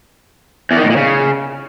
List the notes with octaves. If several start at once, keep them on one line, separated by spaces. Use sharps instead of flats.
E2
D#3
A2
A#2
C#3